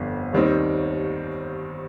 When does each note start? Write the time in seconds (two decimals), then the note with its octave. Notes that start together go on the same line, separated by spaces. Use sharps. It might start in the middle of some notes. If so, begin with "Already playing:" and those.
Already playing: G1 F2 D3
0.33 D#2 D#3 G3 C4 D#4